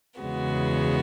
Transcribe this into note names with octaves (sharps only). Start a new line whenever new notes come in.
E2 C#3 G#3 B3 F#4